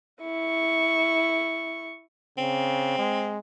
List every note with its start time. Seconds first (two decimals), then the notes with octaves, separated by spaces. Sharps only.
0.22 E4 C#6
2.38 C#3 C4
2.98 G#3